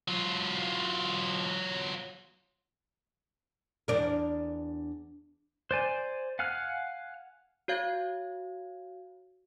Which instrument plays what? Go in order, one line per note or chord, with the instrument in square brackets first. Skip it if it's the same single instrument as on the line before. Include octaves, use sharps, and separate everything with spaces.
[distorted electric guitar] F#3 F4
[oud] E2 D4 A#4
[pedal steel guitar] C5 D5 G#5
F5 F#5 G#5 F6
[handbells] F#4 C#5 F5 G#6